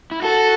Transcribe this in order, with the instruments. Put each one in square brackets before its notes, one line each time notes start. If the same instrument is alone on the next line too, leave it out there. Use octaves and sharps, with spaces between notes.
[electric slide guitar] E4
[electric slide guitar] F#4 [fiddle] A4